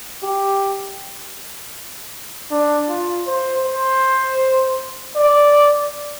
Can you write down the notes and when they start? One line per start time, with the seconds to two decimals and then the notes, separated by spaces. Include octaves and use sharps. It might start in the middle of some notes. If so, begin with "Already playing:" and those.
0.23 G4
2.51 D4
2.89 F4
3.27 C5
3.65 C5
5.16 D5